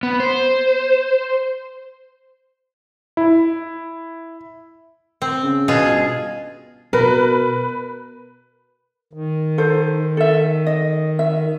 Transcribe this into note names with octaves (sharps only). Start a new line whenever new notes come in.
B3
C5
E4
C4
C#3
B2 F4 G#4
G1
B2 A#4 B4
D#3
D#4 A4 C5
A4 E5
D#5
E5